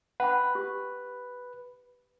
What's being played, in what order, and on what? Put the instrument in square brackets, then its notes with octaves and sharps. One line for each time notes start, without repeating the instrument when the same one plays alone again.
[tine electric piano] B4 [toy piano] F#5 G5 B5
[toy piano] G4